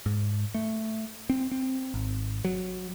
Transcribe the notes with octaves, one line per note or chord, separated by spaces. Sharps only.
G#2
A3
C4
C4
G#1
F#3